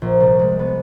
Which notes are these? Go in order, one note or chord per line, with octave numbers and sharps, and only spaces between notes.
A#1
C2
G#3
B3